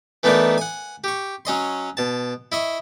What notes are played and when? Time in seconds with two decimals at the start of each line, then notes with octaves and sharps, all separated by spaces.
0.23 E3 A3 B3 D4 D#4 A#4
0.58 F#5 G#5
1.04 G4 C#6
1.45 F#3 C#4 D#5 C6
1.97 B2 A5
2.52 E4 D#5 C#6